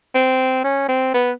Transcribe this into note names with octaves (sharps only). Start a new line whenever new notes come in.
C4
C#4
C4
B3